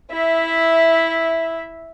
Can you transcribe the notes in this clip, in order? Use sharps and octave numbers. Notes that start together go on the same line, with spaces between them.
E4 E5